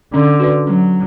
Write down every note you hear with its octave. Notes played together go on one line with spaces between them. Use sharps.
D3 C#4
F#4 B4 D5
F#3 C#4